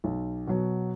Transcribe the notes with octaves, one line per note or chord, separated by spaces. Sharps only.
B1
B2 F#3